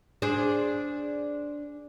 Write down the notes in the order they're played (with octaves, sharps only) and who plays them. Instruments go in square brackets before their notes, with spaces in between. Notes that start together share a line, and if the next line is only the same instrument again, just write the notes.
[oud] D4 G#4 C5